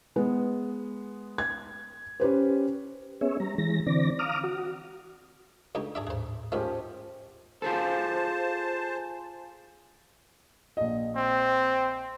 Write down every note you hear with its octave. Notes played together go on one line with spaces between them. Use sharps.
G#3 B3
G#6
C#4 G4 B4 C5
B3 C#4 G#4 C#5 E5
G3 A#5
E3 G#3 A#6
D3 E3 C4 D5 A#6
F5 A#5 D6 D#6 F6
F#4
C#2 D4 D#4 G4 A4
G#2 D4 G#4 D5 E5
D#2 A2 G#4 C5
G#2 D#3 F3 G#3 C#4 G4
F4 G#4 A4 C5 A5
A#1 D#5
C4